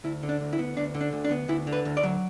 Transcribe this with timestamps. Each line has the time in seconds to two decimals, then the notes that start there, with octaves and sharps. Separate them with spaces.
0.04 D2 E4
0.23 D3
0.29 D4
0.41 D2
0.53 E4
0.59 B3
0.77 D2 D4
0.94 D3
1.01 D4
1.13 D2
1.24 D4
1.31 B3
1.49 D2 E4
1.67 D3
1.73 B4
1.85 D2
1.97 D5
2.03 F#3